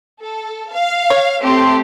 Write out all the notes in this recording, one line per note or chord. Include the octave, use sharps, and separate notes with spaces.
A4
F5
C#5
A3 C4 G4 C6